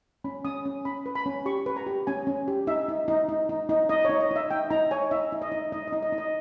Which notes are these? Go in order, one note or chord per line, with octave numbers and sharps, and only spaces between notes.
C#4 B5
C#4 D#6
C#4
C#4 B5
B4
B5
C#4
G4 C#6
B4
A#5
G4
C#4 G#5
C#4
G4
D#4 E5
D#4
D#4
D#4
D#4
D#4
D#4 D#5
C#5
D#4
D#5
D#4
E5
D#4 G5
D#4 A#5
C#5 G#5
D#4 E5
D#4
D#5
D#4
D#4 D#5
D#5
D#4
D#5
D#4
D#5